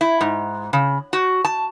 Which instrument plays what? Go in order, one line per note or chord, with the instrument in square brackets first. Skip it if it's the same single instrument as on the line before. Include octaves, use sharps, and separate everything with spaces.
[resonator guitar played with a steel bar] E4
G#2
C#3
F#4
A5